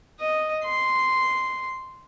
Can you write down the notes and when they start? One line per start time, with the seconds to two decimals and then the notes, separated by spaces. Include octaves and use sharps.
0.20 D#5
0.64 C6